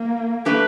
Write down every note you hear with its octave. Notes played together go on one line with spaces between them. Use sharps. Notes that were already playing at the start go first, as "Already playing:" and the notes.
Already playing: A#3
F#3 A3 D4 G4 B4